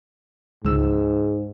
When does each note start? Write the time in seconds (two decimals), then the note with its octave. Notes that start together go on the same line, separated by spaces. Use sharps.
0.65 C#2 G#2 E6